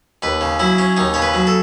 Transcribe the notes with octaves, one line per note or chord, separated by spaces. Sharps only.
D#2 B4
C#3
F#3 E4
C#4
D#2 D#4
C#3 C#5
B4
F#3
A4